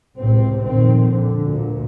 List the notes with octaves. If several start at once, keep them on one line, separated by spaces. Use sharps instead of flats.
C#2 A2 C3 C4
F2 A#2 D#3 C4
D3
D2 A#2